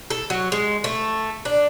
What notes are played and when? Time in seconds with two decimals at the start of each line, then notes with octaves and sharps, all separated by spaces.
0.10 A4
0.30 F#3
0.52 G#3
0.84 A3
1.45 D4